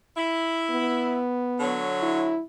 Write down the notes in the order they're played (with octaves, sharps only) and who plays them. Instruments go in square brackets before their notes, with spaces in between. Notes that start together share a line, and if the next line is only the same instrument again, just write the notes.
[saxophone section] E4
[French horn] B3
[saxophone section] D3 F#3 C#5
[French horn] E4